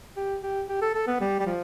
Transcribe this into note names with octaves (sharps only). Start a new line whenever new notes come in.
G4
G4
G4
A4
A4
B3
G3
G3
F3